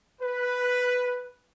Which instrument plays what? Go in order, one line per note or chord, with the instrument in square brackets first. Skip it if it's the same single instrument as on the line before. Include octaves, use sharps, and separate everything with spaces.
[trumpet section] B4